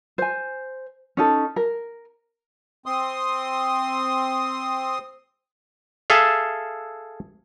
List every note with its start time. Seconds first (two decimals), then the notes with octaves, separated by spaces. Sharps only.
0.18 C5 G#5
1.17 C#4 D#4 A4
1.56 A#4
2.86 C4 C6 D#6
6.10 G#4 A4 E5 F5